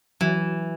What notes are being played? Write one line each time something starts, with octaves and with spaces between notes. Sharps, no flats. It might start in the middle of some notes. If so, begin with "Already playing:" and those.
E3 F#3